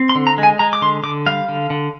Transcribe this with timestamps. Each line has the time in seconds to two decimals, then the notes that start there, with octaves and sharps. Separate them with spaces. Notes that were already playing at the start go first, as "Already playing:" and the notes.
Already playing: C4
0.09 C6
0.15 D3
0.27 A#5
0.38 G#3
0.43 G#5
0.59 G#3 A#5
0.73 D6
0.82 D3 C6
1.03 D3 D6
1.26 G3 F5
1.49 D3
1.70 D3